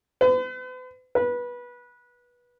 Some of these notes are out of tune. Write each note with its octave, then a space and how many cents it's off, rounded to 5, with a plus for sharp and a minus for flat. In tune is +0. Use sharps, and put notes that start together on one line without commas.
B4 +45
B4 -20